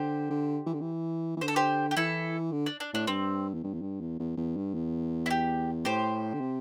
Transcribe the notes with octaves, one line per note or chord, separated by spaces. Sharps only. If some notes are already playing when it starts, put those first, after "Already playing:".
Already playing: D3 G4 C5
D3
E3
D3
E3
E3
D3 C5
A4
G4 C5
G4
E3 E4 A4
D3
D4
D4
A2 D4
G2 C4
E2
G2
E2
G2
E2
E2
E2
G2
E2
E4
G4
A2 G4 C5
D3
C3